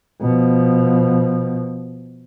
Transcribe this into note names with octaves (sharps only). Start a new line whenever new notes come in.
B2 F3